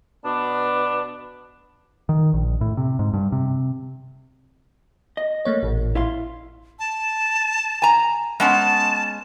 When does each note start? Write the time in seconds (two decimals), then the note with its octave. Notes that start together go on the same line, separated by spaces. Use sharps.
0.24 B2 B3 D4
2.09 D#3
2.33 A#1
2.61 A2
2.77 C3
2.99 G#2
3.14 G2
3.32 C3
5.17 D#5
5.45 A3 A#3 C#5
5.63 A1 A#2
5.95 E4 F5 C6
6.79 A5
7.82 G#5 A#5
8.40 G#3 B3 C#4 A5